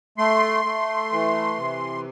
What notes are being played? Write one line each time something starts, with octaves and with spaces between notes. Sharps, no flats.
A3 C6
A3
E3
C3